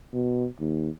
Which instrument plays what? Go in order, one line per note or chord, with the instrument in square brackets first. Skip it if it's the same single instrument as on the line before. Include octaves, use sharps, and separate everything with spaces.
[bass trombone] B2
D#2